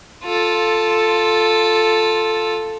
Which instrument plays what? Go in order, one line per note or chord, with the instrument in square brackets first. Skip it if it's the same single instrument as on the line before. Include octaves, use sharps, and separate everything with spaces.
[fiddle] F4 A4